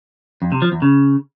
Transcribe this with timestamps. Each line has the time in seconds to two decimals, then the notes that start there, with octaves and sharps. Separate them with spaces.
0.42 F2
0.52 C3
0.62 F3
0.72 E2
0.82 C#3